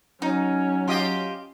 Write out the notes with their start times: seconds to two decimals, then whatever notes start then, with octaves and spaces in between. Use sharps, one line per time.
0.22 F#3 C#4 D#4
0.88 F4 G4 D#5